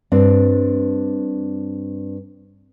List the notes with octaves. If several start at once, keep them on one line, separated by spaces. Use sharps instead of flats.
G2 C4 D4